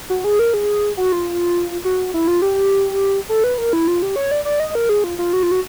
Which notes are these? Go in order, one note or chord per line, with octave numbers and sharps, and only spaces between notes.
F#4
G#4
A#4
G#4
F#4
F4
F#4
E4
F4
G4
A4
B4
A#4
E4
F4
G4
C#5
D5
D5
D#5
A#4
G#4
F4
F4
F#4
F4
F#4